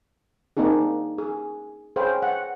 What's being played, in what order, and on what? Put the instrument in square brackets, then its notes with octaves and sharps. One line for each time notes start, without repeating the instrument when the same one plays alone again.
[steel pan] A#3 C4 D4 D#4 G#4
G#4
G#4 C5 C#5 F5 G5 B5
F#5